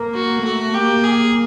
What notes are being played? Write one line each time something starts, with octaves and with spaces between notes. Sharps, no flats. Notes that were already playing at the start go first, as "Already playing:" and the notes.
Already playing: A#3
F#4
A3 F#4
A#3 G4
G#4